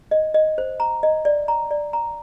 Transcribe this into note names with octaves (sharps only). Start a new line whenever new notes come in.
D#5
D#5
C5
A#5
D#5
D5
A#5
D5
A#5